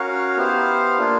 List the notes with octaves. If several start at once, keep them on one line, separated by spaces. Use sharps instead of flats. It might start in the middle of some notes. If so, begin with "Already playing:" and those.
Already playing: C#4 F#4 A#4 C#5 F5
B3 E4 G4 C5 F5
A#3 D4 F4